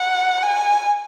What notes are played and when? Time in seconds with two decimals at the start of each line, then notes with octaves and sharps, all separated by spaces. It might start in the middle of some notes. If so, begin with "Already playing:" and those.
Already playing: F#5
0.43 G#5